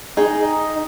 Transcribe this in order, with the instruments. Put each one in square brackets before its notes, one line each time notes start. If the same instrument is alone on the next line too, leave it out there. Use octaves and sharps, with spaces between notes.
[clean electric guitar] D#4 [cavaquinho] G#4 G5